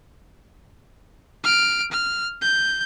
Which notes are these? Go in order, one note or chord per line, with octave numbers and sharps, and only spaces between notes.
F6 D7
F6
G6